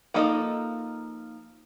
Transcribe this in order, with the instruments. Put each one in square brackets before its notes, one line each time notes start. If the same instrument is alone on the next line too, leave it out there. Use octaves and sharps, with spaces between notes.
[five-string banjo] F3 A#3 D#4 A4 D#5